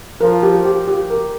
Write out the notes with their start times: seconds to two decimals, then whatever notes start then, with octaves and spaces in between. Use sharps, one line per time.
0.21 F3 A#4
0.43 G4
0.65 G4
0.88 G4
1.10 A#4